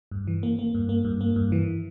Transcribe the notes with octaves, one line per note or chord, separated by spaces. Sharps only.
G2
E3
A#3
A#3
G2
A#3
G2
A#3
G2
E3